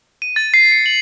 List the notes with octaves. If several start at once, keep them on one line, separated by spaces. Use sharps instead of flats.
D#7
A6
C7
C#7
F#7